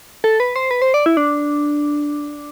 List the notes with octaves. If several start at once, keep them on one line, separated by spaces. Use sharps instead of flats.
A4
B4
C5
B4
C5
D5
E4
D4